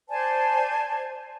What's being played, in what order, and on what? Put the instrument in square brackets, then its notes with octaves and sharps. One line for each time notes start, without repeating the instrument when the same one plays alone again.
[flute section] C5 D5 G#5 A5